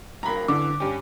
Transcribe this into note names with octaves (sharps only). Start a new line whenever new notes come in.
G2 F#3 A#3 A#5 B5
F#2 D3 E3 D6
G2 C#4 G4